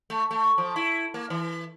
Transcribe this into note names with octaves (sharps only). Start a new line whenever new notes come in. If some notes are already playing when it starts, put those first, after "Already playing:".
A3
A3
F3
E4
A#3
E3